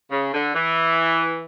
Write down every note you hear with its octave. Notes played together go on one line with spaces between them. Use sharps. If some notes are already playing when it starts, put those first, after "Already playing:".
C#3
D3
E3